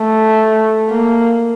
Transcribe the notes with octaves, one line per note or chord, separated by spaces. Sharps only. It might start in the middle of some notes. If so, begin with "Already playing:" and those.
Already playing: A3
A#3